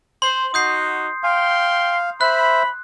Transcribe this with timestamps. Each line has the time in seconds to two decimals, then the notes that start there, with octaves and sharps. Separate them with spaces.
0.22 C5 C6
0.54 D#4 F#4 D#6 G6 C7
1.23 F5 G5 C6
2.21 C5 E5 B5 F#6